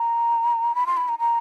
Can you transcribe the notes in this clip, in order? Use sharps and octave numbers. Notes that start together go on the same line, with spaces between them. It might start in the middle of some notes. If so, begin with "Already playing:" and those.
Already playing: A#5
B5
C6
B5
A#5
A#5